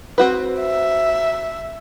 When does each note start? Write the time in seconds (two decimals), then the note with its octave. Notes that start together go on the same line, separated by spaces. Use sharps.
0.18 C4 F#4 B4
0.61 E5